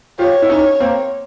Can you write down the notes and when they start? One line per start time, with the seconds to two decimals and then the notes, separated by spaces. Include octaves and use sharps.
0.19 F4 G4 C#5
0.42 E4
0.50 C#4 D#4
0.80 A#3 C4